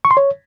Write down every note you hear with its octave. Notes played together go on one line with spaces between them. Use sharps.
C#6
C6
C#5